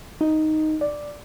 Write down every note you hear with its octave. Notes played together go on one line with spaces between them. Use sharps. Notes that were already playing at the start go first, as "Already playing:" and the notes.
D#4
D5